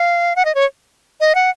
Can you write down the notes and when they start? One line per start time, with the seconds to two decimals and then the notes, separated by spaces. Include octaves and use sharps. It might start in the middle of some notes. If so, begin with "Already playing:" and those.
Already playing: F5
0.36 F#5
0.45 D#5
0.55 C#5
1.21 D#5
1.35 F#5